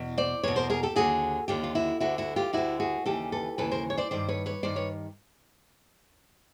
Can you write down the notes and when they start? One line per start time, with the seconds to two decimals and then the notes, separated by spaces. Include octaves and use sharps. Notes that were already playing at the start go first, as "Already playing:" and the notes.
Already playing: E2 B2
0.18 C5 D5
0.43 E2 B2 B4 C#5
0.56 A#4 C5
0.70 G#4 A#4
0.83 G4 A4
0.96 D#2 D3 F#4 G#4
1.48 D#2 D3 F4 G4
1.64 F4
1.75 E4 F#4
2.00 D2 D3 E4 F#4
2.18 E4 F#4
2.36 F4 G4
2.53 D2 D3 E4 F#4
2.80 F#4 G#4
3.06 D#2 C#3 E3 G4 A4
3.32 A4 B4
3.58 D#2 C#3 E3 A4 B4
3.71 A#4 C5
3.90 C#5
3.97 C5 D5
4.11 G2 D#3 C5 D5
4.29 B4 C#5
4.46 B4 C#5
4.63 G2 D#3 C5 D5
4.76 B4 C#5